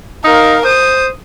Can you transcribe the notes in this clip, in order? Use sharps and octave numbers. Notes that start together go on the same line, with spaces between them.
D#4 A#4 F5
C5 D#6